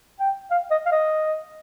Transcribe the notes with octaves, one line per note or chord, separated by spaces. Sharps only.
G5
F5
D#5
F5
D#5